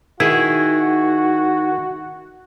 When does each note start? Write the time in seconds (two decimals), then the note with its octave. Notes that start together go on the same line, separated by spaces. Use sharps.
0.20 D#3 E4 F#4 G#4